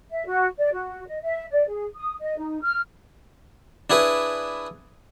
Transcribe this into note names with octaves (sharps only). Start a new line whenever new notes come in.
E5
F#4
D5
F#4
D#5
E5
D5
G#4
D#6
D#5
D#4
F6
D4 E4 G#4 B4